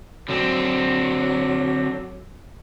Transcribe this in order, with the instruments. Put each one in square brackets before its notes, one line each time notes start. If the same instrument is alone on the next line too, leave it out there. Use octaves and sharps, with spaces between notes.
[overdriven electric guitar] D3 C4 [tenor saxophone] F#3